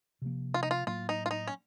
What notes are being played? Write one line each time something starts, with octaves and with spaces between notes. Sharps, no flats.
C3 F3 A#3
F4
D#4
F4
A2 F#3 A#3 F4
D#4
F4
D#4
C#4